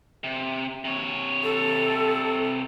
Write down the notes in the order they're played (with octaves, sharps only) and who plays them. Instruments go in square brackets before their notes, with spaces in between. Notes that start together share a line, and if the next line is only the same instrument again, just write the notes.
[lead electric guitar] C3
C3 C#5
[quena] A4